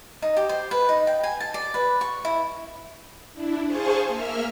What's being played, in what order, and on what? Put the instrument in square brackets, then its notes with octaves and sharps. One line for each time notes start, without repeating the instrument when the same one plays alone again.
[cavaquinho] D#4
G4
C5
B4
D#4
G5
G#5
A5
D5
B4
C#6
E4
[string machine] D4 E4
G#4 C5 F5 G#5 A5 C#6
A#3 E5 F6